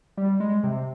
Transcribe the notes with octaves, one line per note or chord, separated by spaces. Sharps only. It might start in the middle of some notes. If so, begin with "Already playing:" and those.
G3
G#3
C3